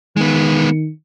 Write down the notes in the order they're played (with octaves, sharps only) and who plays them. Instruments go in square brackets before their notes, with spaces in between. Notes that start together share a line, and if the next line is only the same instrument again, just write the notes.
[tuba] D#3 [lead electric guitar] G#3 B3